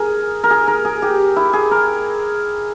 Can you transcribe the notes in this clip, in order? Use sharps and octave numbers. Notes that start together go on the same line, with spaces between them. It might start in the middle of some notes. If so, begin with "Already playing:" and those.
Already playing: G#4 A#4
A#4
G#4
A#4
G#4
G4
E4
G#4
A#4